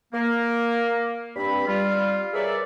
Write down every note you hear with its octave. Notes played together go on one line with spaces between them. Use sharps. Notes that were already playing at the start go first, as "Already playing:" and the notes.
A#3
G2 C4 B5
G3 F4
G#4 A#4 B4 C#5 D5 E5